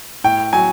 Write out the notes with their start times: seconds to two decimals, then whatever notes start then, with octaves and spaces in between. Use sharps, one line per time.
0.24 A2 G5
0.53 F#3 G#5